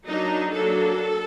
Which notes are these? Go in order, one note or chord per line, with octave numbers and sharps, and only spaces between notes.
F#3 A#3 D4 D#4
F#3 A#3 D4 A4